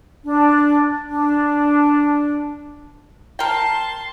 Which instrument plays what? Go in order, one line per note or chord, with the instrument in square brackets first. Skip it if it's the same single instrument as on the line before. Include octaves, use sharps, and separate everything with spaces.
[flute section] D4
D4
[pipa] A#4 G5 [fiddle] A5 C6